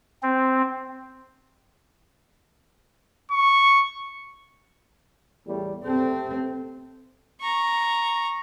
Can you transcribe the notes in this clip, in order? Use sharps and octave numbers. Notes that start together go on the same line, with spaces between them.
C4
C#6
E2 A2 G3
C3 A3 C4 A4
A#5 C#6